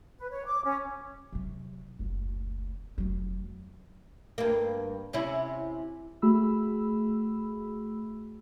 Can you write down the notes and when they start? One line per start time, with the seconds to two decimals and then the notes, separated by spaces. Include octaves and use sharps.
0.18 B4
0.31 C#5
0.46 D6
0.64 C#4
1.32 C3 F#3
1.99 F#1 D2
2.98 F1 F#3
4.38 G2 A#3
5.13 C3 C#4 E4
6.22 A3 F#4 G#4 B5 E6